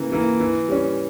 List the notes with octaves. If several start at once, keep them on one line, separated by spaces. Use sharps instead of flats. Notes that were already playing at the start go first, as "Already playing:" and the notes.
Already playing: C#3 E3 A#3
E3 A#3
E3
G3 C#4